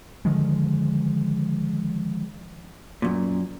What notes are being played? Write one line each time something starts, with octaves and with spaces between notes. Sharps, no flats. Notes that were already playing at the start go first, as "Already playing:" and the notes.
D3 D#3 F3 G#3
F#2 A#2